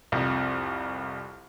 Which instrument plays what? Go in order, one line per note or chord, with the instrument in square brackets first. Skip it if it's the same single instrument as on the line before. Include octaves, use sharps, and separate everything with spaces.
[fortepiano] C2 F2